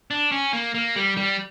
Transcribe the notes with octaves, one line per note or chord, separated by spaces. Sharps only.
D4
C#4
A#3
A#3
G3
G3